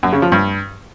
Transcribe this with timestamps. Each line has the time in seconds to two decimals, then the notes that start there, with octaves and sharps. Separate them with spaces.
0.03 F#2
0.13 C#3
0.22 F3
0.32 G2